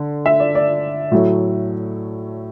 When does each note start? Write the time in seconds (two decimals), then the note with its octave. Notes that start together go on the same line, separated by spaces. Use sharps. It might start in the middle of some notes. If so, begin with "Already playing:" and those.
Already playing: D3
0.26 E5
0.40 D5
0.55 D5
1.12 A2 F#3 A3